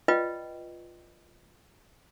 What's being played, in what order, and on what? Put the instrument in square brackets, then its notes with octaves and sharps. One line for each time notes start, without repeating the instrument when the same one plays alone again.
[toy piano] F4 B4 D5 D#5 G5